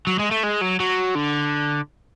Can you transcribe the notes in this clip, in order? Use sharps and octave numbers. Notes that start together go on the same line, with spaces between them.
F#3
G#3
A3
G#3
F#3
F#3
D3